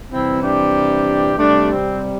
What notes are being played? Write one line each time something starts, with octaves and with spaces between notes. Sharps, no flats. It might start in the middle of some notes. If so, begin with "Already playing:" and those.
C3 E3 G3 C4 E4
D4 G4
C3 G3 A3 D4
C4